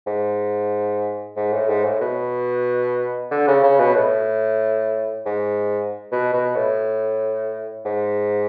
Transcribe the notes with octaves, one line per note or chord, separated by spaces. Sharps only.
G#2
G#2
A2
G#2
A2
B2
D3
C#3
C#3
B2
A2
G#2
B2
B2
A2
G#2